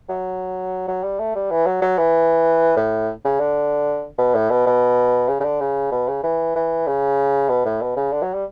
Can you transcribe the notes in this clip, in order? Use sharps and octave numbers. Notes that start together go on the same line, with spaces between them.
F#3
F#3
G3
A3
G3
E3
F#3
F#3
E3
A2
C#3
D3
B2
A2
B2
B2
C#3
C#3
D3
C#3
B2
C#3
E3
E3
C#3
B2
A2
B2
C#3
D3
F#3
G3